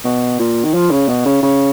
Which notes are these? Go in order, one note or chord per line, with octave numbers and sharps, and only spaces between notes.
B2
A#2
D#3
F3
C#3
B2
C#3
C#3